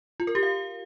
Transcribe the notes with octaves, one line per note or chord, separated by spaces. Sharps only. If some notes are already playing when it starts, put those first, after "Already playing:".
F4
A#4
G4
F5